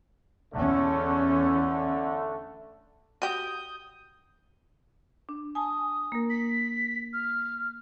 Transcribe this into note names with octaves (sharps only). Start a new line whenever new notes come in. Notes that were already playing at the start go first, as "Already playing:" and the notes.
E2 D3 A3 C#4
F#4 G4 D#6 G6
D4
G#5 A5 D#6
A#3 A#4
B6
F6